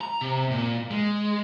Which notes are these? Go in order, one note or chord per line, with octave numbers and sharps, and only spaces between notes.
A#5
C3
A#2
G#3